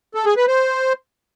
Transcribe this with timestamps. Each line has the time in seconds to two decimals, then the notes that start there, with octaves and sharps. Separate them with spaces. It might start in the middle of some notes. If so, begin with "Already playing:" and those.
0.15 A4
0.26 G#4
0.37 B4
0.48 C5